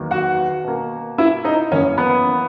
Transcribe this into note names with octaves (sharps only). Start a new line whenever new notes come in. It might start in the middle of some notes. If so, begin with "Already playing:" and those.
Already playing: E2 D#3 F#3 A#3
F#4 F#5
B2 A#3
E4 E5
D#4 D#5
F#2 E3 A#3 C#4 C#5
B3 B4